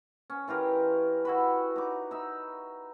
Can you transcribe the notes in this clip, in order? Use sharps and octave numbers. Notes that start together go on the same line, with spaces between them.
C#4
E3 F4 G4 A#4
E4 F#4 B4
D#4 D6
D#4 E5